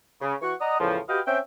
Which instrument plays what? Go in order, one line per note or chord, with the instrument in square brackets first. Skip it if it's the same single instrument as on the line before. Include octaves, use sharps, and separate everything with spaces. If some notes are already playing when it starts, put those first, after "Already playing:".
[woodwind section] C#3
E3 F#4 F#5 C#6
D5 D#5 F#5 A#5 D#6
E2 A2 C#3 F3
F#4 G4 B4 D#5 F5 G5
C4 C#4 E5 G5